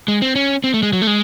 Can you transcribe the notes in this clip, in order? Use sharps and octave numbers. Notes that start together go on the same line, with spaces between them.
G#3
C4
C#4
C4
A3
G#3
F#3
A3
G#3